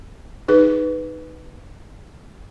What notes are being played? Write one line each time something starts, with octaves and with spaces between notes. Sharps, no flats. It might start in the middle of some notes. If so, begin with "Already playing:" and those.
D#4 G#4 B4